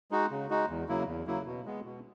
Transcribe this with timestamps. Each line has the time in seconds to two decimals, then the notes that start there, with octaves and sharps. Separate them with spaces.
0.11 G#3 D#4 F#4
0.31 C#3
0.50 G#3 D#4 F#4
0.69 E2
0.89 C#3 F#3 A#3 E4
1.07 E2
1.27 C#3 F#3 A#3 E4
1.46 B2
1.65 G#3 B3
1.84 B2